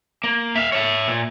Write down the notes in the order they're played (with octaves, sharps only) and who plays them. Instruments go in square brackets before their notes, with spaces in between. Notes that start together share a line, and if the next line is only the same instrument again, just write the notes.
[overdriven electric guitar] A#3
E5 F5
C#5 E5
A#2